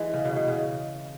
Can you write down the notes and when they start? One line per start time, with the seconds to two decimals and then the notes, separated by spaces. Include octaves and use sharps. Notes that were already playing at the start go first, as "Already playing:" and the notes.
Already playing: E3 G#3
0.13 C#3
0.25 B2
0.36 B2
0.48 C#3